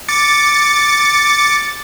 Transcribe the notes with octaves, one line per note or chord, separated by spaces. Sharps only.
D6 A6 C#7